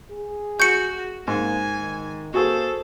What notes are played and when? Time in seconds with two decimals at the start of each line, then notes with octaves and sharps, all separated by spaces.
0.12 G#4
0.60 F#4 C#6 G6 C#7
1.28 G#2 A#3 G#5
1.81 D#3
2.34 A#3 F#4 G#4 A4 C5